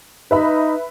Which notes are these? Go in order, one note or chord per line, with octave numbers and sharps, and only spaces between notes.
D#4 B4 E5 B5